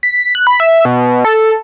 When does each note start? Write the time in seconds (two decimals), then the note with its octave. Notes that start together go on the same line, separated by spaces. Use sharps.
0.03 B6
0.35 F#6
0.47 B5
0.60 E5
0.85 B2
1.25 A4